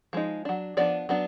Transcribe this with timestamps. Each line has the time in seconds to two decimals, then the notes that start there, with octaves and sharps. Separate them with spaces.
0.13 F3 G#3 D#4
0.45 F#3 D4
0.77 F3 B3 D4 D5
1.09 F#3 B3 D4